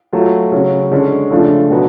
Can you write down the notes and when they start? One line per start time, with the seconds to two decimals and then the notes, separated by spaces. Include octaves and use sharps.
0.13 F#3 A3 F4
0.52 C#3 F#3 C#4
0.91 D3 G#3 C#4
1.30 C#3 F3 A3 D4 F4
1.70 B2 F#3 B3 F#4